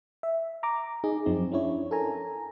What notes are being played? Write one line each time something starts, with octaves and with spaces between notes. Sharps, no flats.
E5
A#5 D6
D#4 G#4
F#2 F3 C4 D#4
C#4 D4 E4 C#5
A4 A#4 G#5 A#5